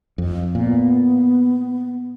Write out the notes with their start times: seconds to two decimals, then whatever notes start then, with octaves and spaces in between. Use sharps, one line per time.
0.18 F2
0.55 A#2 B3